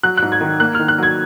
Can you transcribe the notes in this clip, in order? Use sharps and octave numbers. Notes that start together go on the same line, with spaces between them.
F#3 F#6
G#2 F#6
G#6
D#3
A#3 F#6
D#3 F6
F#6
F#3 G#6